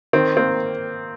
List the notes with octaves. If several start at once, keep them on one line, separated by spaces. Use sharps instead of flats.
D#3 C4
A#3 C4